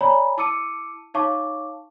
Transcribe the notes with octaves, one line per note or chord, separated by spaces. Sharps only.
C#5 D5 G#5 A#5 B5
E4 A5 D6 E6 C#7 D#7
D#4 C#5 F5 A5 C#6 D6